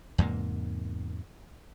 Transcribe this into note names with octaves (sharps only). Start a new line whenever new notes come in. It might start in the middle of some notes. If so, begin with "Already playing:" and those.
E2 G#2 C3 A#3